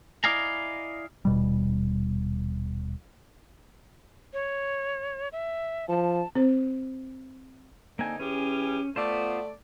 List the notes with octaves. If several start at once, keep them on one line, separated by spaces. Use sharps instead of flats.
E4 D5 D#5 F5 G#5 A#5
D#1 B2 G3
C#5
E5
F3 A5
C4 C5
D3 A#3 C4 D#4 G#5
E3 C#4 G4 G#4
A3 B3 F4 C5 D5